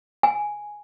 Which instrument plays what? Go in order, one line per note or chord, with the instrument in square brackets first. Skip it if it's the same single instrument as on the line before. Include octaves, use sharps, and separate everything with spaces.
[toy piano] G#5